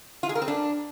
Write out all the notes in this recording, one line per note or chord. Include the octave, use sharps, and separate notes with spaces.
F4
G#4
A#4
C4
D4